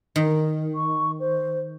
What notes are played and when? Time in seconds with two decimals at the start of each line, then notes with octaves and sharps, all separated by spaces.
0.16 D#3
0.75 C#6
1.20 C5